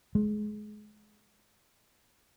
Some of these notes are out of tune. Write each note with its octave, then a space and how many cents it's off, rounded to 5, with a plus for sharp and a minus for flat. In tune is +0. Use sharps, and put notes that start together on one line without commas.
G#3 +25